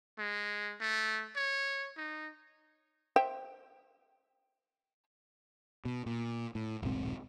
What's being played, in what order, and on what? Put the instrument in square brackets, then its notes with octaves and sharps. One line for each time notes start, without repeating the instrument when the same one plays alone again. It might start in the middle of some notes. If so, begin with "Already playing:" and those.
[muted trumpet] G#3
A3
C#5
D#4
[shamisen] C5 E5 G5
[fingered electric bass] B2
A#2
A2
D#1 B1 G#2 C4